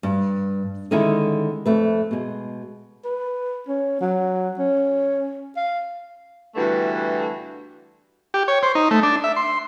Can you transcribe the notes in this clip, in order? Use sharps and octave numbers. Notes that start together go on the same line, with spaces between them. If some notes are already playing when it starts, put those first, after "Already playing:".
G2
D3 D#3 G#3 C#4 E4 A#4
F2 A3 B4
B2 G#3
B4
C#4
F#3
C#4
F5
G2 D3 E3 A3 B3 F#4
G4
C#5
C5
D#4
A3
D4
E5
C6